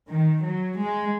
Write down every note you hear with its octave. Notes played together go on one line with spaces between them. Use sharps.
D#3
F#3
G#3